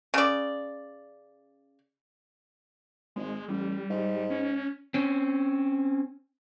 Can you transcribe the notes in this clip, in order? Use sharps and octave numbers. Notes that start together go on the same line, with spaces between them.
C#3 D5
G#1 G#3
A1 G3
G#2
C#4
C4 C#4